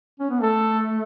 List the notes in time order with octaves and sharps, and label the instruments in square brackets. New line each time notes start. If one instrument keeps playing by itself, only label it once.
[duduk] C#4
B3
[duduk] A3 [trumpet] A4